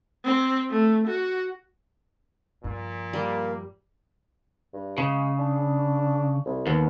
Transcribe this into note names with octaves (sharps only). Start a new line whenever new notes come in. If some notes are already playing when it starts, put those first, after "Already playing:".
C4
A3
F#4
G2 A#2 F3
G3 A#3
G2
C#3 G#3
D4
C2
D#2 B3